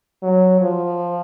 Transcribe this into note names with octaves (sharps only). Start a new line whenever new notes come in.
F#3
F3